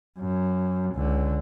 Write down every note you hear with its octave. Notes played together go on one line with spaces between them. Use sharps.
F#2
C#2 D3